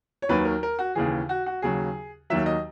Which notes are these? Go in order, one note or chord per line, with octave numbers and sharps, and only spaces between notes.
C#5
D#2 D#3 F#3 B4
A#4
A#4
F#4
D#2 C#3 E3 G#4
F#4
F#4
D#2 C#3 F#3 G#4
D#2 D#3 F#3 E5
D#5